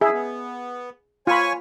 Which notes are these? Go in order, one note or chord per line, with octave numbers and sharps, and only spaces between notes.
G2 E4 G#4 E5
B3
F4 C#5 G#5 B5 C#6